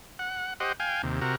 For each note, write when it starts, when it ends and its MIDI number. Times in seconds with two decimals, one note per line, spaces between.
0.19 0.54 78
0.60 0.72 67
0.60 0.72 72
0.60 0.72 75
0.60 0.72 78
0.80 1.02 77
0.80 1.02 79
0.80 1.02 80
1.03 1.20 39
1.03 1.20 48
1.21 1.35 48
1.21 1.35 66
1.21 1.35 70